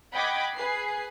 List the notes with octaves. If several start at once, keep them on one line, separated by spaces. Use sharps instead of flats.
D#5 F#5 G5 B5 D6 G#6
G#4 B4 C7